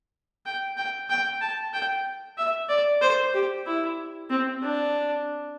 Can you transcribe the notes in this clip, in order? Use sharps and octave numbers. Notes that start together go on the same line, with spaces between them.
G5
G5
G5
A5
G5
E5
D5
C5
G4
E4
C4
D4